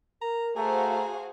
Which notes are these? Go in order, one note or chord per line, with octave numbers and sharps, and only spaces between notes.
A#4 A#5
A3 F#4 G#4 C5 F5 A#5